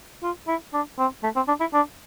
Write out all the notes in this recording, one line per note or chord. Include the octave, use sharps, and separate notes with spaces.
F4
E4
D4
C4
A3
C4
D4
E4
D4